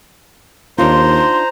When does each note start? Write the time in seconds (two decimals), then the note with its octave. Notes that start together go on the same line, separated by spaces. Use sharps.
0.78 D#2 D4 D#4 F4 C5 A#5 C6